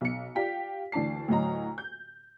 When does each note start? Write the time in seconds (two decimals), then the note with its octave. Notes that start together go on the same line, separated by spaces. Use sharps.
0.01 B1 C#7
0.35 F4 G4 D5 F5 G5 B6
0.92 D2 E3 D4 D5 A5 C7
1.28 D2 A2 F#3 D#5 A#5
1.78 G6